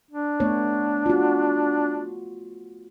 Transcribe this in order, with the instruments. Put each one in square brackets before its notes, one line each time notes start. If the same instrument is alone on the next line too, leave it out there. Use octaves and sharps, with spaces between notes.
[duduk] D4
[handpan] A3 B3 C#5
F4 F#4